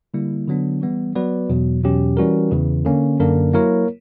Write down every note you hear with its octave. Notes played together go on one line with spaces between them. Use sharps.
D3 G3 A#3 E4
D3 F#3 B3 D4
E3 G3 B3
F#3 B3 F#4 B4 D5
E2 B2 F#3
E2 B2 F#3 C#4 G4
E3 G3 C#4 F#4 A#4
E2 C#3 E3
D3 A#3 C#4
F#2 D3 A#3 D4 A#4
F#3 A#3 E4 A#4 C#5